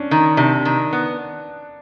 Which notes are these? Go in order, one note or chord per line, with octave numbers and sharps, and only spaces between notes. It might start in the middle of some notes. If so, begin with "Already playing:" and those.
Already playing: C#4 D4
D#3
C3 D4
D#3
B3